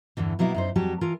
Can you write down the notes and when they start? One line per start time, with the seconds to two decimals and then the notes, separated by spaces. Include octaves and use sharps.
0.17 E2 G2 D3 E3
0.39 B2 F#3 A#3 B3 E4
0.54 F#2 D#4 C5
0.76 F2 F#3 G3 F#4 G4 A5
1.01 E3 F4 A#4